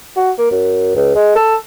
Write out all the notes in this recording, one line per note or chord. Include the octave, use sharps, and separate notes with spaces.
F#4
A#3
F#2
C#2
G#3
A4